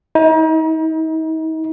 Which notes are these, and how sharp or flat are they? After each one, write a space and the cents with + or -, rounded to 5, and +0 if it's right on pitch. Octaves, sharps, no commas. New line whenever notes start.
D#4 +40